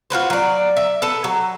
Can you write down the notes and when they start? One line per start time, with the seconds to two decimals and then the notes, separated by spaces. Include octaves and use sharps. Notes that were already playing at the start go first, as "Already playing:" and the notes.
0.10 F4 F#4 B4 C5
0.30 F#3 D5
0.77 E5
1.02 A4 B4 A5
1.24 F#3